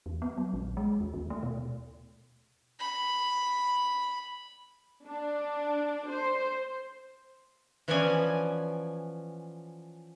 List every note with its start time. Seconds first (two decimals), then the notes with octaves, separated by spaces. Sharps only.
0.06 E2
0.22 B3
0.37 F#3
0.53 A#1
0.77 G#3
1.00 D#2
1.14 D#2
1.30 A3
1.43 B2
2.79 B5
5.06 D4
6.10 C5
7.88 E3 F3 B3 C#4 D5 G#5